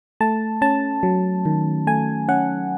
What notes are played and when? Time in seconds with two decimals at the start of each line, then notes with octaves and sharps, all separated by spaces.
0.20 A3 A5
0.62 C#4 A5
1.03 F#3
1.45 D#3
1.87 A3 G#5
2.29 C#4 F#5